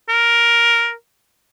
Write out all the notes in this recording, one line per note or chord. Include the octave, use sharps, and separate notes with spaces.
A#4